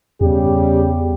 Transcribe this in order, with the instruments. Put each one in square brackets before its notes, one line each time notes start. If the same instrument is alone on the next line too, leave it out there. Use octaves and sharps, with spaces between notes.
[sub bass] E2 [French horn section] C#3 G3 G4